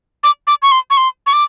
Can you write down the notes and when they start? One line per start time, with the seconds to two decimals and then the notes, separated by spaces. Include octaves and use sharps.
0.23 D6
0.47 D6
0.62 C#6
0.72 C6
0.90 C#6
0.97 C6
1.26 C#6
1.33 D6